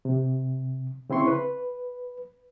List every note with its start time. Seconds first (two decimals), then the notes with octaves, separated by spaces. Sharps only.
0.05 C3
1.10 C#3 C4 E4 C6 C#6
1.27 B4